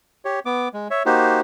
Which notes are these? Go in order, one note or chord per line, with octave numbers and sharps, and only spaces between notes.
G4 C#5
B3 D6
G#3
C#5 E5
A#3 D#4 F#4 G4 C5